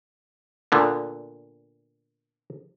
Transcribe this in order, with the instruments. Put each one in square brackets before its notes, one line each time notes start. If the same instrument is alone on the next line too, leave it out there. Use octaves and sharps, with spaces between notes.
[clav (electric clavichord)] A#2 D3 B3